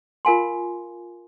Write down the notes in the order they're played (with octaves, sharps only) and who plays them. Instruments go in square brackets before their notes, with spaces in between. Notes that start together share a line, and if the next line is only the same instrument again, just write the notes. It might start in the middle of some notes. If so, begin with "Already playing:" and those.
[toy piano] F4 A#4 F5 G#5 C6